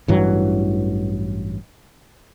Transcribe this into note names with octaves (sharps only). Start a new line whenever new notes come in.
A1 G2 E3 F#3